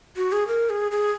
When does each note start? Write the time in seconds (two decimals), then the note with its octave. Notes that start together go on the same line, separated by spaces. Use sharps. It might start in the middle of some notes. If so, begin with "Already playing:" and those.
0.16 F#4
0.32 G#4
0.48 A#4
0.69 G#4
0.91 G#4